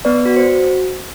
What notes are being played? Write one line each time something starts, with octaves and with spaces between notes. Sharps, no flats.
B3 B4 D5
F#4
C5
F#4